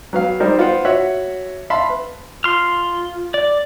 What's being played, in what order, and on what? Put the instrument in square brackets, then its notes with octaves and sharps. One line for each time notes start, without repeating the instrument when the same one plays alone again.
[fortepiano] F#3 B3 F5
G3 D#4 A#4 C5
B3 F4 C5 F#5
F#4 C#5 E5 F#5
E5 F5 A5 B5 C6
B4
[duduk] F4 [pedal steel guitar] C6 F6
[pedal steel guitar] D5